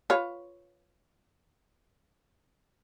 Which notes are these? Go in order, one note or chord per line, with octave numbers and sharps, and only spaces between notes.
F4 B4 C#5